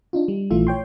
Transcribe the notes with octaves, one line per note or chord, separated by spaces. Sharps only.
D4 D#4 F4
G3
A#1 E3 A3 F4 E5
C#5 G5 C6